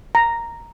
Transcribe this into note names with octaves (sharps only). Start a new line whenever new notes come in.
A#5